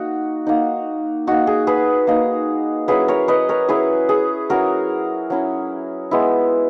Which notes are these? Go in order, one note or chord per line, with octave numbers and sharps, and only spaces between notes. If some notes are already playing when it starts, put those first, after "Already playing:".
Already playing: A#3 D#4 F#4
A#3 D#4
A#3 D#4 F#4
G#4
G#4 B4
A#3 D#4
F#3 C#4 E4 G#4 B4
A#4 C#5
B4 D#5
A#4 C#5
F#3 C#4 E4 G#4 B4
G#4
F#3 C#4 E4 F#4 A#4
F#3 C#4 E4
G#3 B3 E4